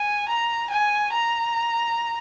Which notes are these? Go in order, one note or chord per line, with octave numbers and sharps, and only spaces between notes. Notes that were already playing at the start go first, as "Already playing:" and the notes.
Already playing: G#5
A#5
G#5
A#5